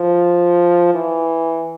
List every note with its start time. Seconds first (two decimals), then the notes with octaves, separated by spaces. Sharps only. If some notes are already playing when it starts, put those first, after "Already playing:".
Already playing: F3
0.94 E3